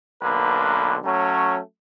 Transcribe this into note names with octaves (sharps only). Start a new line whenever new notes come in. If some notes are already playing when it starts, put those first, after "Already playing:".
B1 D3 A#3 B4
F#3 A3 C#4